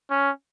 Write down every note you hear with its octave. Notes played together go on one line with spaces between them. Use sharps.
C#4